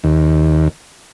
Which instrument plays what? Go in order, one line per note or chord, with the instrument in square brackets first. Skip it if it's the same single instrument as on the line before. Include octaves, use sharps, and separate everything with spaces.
[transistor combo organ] D#2